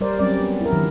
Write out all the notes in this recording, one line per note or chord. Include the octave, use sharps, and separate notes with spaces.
G3 A#4 C5 D5
F#3 G3 C4 C#4 D5
B3
E4 A#4
D#3 F3 F#3